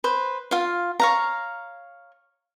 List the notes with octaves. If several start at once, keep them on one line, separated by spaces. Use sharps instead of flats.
B4 C5
F4 F5
C#5 F5 A#5